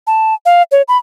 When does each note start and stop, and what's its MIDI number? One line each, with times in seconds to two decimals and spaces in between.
0.07 0.34 81
0.46 0.63 77
0.72 0.82 73
0.88 0.97 83